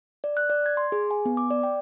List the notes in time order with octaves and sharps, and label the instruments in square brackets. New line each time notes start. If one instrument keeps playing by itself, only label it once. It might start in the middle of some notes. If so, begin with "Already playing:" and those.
[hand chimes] D5
F#6
D5
G#6
C6
G#4
G#5
B3
D6
D5
G5